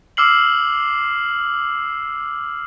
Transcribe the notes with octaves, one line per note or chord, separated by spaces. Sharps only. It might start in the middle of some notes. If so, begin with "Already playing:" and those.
D6 E6 F6 C7 F#7